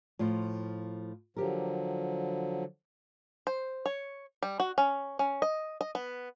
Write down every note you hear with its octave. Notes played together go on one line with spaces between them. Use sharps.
A2 F3 F4
D3 F3 F#3 G4 A#4
C5
C#5
G3
F#4
C#4
C#4
D#5
D#5
B3